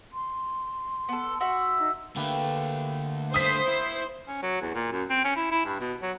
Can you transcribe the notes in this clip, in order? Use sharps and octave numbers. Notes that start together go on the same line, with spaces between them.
C6
B3 A4
F#4 E5
D#4
D3 A3 A#3 G4 B4
D3 A3 C5 D#6 B6
E4
C#4
F#3
E2
A#2
F#2
C4
C#4
E4
E4
G2
B2
F#3